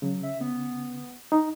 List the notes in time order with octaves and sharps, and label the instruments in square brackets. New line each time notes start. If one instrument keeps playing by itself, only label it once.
[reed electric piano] C#3 [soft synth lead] F#3
[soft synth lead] E5
B3
[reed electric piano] D#4